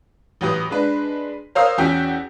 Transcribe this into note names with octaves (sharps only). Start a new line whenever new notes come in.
A1 F#3 G4 B4 D#6 A#6
G#3 D4 B4
A#4 C5 C#5 F5 D#6 E6
E2 C#4 F#4 G5 B6